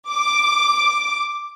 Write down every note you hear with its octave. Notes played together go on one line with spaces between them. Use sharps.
D6